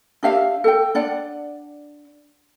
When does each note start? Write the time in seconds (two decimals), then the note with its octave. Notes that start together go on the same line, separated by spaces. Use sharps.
0.23 D4 G4 E5 F5
0.64 A4 G5
0.95 D4 D5 F#5